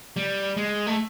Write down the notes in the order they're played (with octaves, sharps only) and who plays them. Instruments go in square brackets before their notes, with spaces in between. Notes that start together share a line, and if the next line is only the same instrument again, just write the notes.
[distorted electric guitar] G3
G#3
A3